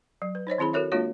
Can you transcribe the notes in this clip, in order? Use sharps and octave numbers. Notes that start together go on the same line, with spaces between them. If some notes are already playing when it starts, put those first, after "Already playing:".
F#3
B4
D#4 C5 C#5 D#5
D#3 C4 E4 G#4 B5
F#4 A4 A#4 C#5 E5
G#3 A#3 D4 F4 F#4 C#5